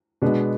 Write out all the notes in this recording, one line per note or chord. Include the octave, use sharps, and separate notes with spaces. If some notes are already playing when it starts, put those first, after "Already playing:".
B2 G#3 B3 D4